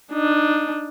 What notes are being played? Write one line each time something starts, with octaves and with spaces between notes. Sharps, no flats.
D4 D#4